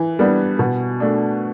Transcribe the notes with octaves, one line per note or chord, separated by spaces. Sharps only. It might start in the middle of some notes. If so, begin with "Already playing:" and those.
Already playing: E3
G3 B3 D4
B2
A3 D4